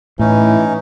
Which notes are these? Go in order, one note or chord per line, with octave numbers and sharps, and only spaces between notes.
A2 E3 C#4 D#4